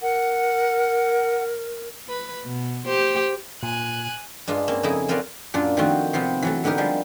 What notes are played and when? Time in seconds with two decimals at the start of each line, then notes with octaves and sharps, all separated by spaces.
0.02 A#4 F#5
2.09 B4
2.45 B2
2.85 G4 C5
3.63 A#2 G#5 F#6
4.48 G2 G#3 D4 F4
4.68 A#3 C4 C#4
4.83 F2 C#3 D#4 E4 G#4 B5
5.08 C4 F4 A#4 B4 C#5 D5
5.54 F#2 A#2 D4 F4
5.77 D#3 F3 A3 C4 F#4
6.13 C3 F3 B3 C4
6.43 E3 F#3 A3
6.64 D3 B3 D#4 G4 A#4
6.78 F3 G3 G#3